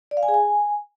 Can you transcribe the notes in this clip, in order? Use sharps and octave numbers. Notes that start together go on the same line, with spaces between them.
D5
F5
G#5
G#4
G#5